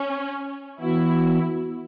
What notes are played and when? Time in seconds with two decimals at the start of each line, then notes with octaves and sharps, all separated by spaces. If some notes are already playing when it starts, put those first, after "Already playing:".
Already playing: C#4
0.80 E3 B3 E4 F#4